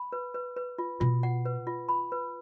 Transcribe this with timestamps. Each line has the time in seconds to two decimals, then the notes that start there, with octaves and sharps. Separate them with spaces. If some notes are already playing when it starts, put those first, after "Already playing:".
Already playing: B5
0.12 B4
0.34 B4
0.57 B4
0.78 F4
1.00 B2 F4
1.23 F#5
1.45 B4
1.67 F4
1.89 B5
2.12 B4